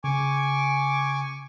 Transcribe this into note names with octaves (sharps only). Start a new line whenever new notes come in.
C#3 G#5 C#6 D6